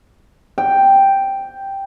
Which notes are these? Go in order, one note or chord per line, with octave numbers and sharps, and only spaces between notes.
G5